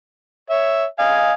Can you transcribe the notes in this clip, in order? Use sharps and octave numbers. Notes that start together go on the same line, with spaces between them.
C#5 E5
D#5 F5 G#5